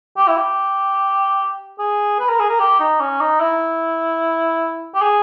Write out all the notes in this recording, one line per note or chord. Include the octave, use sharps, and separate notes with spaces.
G4
E4
G4
G#4
B4
A#4
G#4
A#4
G4
D#4
C#4
D#4
E4
G4
G#4